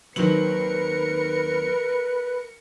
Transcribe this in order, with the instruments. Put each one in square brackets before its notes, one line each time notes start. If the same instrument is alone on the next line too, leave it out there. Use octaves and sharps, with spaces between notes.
[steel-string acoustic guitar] D#2 F#3 C4 [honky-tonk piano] D#3 F#7 [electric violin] A#4 C#7 [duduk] B4